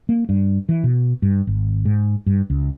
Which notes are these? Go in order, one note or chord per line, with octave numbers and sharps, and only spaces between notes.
A#3
G2
E3
B2
G2
G#1
G#2
G2
C#2